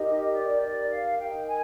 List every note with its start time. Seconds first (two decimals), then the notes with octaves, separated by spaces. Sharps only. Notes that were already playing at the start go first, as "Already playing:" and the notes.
Already playing: D#4 G4 A#4 D#5
0.32 D5
0.61 D5
0.90 F5
1.19 D#4 A#4 G5
1.47 G#5